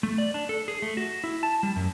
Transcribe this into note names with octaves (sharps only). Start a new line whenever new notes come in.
A3
D5
D4
A4
G#4
A3
F#4
E4
A5
G3
F#2